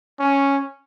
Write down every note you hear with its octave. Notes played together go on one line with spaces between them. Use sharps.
C#4